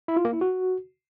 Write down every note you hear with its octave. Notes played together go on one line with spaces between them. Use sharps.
E4
F4
A#3
E4
F#4